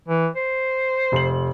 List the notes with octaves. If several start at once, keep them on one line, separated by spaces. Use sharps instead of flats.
E3
C5
F1 C6 F#7